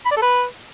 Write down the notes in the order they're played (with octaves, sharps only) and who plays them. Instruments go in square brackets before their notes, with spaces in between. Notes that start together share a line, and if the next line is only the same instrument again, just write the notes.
[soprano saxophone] B5
D5
A4
B4